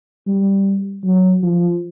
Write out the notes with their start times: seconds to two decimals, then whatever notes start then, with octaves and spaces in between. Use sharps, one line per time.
0.27 G3
1.05 F#3
1.43 F3